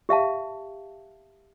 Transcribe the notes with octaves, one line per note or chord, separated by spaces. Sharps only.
G4 E5 F5 A5